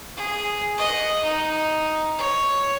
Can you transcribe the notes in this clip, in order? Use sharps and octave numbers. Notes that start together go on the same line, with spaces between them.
G#4
D#5 F#5
D#4
C#5